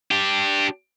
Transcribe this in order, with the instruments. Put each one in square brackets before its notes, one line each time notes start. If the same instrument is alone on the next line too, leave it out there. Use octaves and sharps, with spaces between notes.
[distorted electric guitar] D4 G4